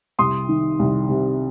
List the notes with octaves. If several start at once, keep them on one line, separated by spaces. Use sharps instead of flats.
C2 C6 D#6
D#3
C2
C3